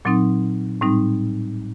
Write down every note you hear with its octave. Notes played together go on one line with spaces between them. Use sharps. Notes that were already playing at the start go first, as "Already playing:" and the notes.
A#2 F#3 C4 D#4
A2 G3 C4 D#4